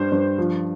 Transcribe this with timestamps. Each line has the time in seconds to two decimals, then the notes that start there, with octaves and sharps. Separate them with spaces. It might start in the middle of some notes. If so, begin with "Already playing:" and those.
Already playing: G2 G3 C5
0.12 G2
0.38 F3